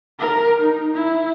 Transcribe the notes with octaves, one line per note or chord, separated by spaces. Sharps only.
A#4
D#4
E4